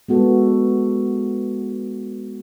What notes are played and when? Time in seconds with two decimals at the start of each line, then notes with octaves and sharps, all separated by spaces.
0.09 G#3 B3 F#4 A4